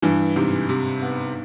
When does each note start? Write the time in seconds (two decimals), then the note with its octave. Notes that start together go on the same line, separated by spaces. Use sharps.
0.02 G2 E3
0.36 G#2 C3
0.69 C3
1.02 B3